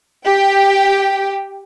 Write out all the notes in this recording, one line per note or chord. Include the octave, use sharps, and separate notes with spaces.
G4 G5